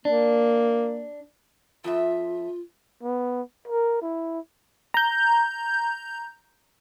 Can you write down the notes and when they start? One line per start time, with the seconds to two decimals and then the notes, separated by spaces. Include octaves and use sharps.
0.05 A#3 D4
1.84 F2 F4 E5
3.03 B3
3.68 A#4
4.02 E4
4.94 A#5 G6